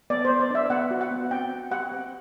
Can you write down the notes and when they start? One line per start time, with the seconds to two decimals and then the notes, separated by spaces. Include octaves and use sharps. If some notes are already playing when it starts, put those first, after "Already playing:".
0.10 B3 D5
0.25 C5
0.30 B3
0.40 D5
0.50 D4 E5
0.70 B3 F#5
0.91 F#4
1.01 F#5
1.11 B3
1.31 C4 G5
1.51 C4
1.71 G4 F#5
1.92 C4